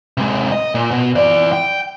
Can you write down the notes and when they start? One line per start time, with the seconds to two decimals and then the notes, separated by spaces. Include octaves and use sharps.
0.17 C3 G#3
0.52 D#5
0.75 A#2
0.91 B2
1.16 E3 D5
1.52 G5